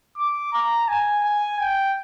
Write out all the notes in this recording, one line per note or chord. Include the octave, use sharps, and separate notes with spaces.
D6
A#5
G#5
G#5
G5